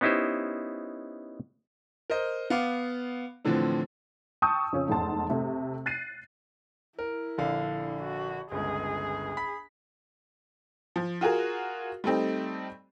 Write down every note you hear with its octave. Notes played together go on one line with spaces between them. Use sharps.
B3 C#4 D#4 E4 G4 C5
A#4 C5 D#5
B3 F5 D6
A2 D3 E3 F3 C4
G5 A5 C#6 D#6 E6 G6
F2 C#3 F3 C#4
F1 E2 G#2 A5 C6
C3 A3
F#6 A6 C7 D#7
E4 A#4
A#1 D3 F5
F#4
G1 C#2 G#4
B5 B6
F3
F4 F#4 G#4 A#4
G3 A3 C4 D#4